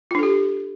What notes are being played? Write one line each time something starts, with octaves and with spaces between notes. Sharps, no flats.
D4 F4 G4 A4